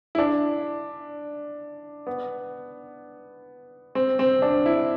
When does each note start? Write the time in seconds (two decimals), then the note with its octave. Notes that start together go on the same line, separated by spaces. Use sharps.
0.15 E4
0.18 D4
2.07 B3
3.95 C4
4.19 C4
4.42 D4
4.66 E4